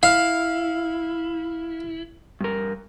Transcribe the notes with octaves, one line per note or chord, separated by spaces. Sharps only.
E4 F5
G2 A#4